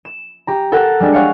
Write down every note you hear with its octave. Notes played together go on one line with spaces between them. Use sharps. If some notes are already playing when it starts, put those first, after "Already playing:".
E7
G4 A#5
A4 A#4 F#5 A5
G3 G#3 D4
C#5 F5 F#5 C#7